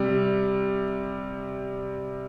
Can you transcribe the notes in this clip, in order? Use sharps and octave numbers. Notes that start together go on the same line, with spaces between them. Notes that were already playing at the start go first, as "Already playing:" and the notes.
Already playing: C3 G3